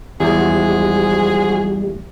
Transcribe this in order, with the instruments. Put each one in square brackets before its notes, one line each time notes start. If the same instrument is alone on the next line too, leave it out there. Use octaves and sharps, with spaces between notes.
[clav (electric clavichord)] E2 [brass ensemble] F3 G#3 F#4 [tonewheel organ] G3 [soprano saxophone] G#4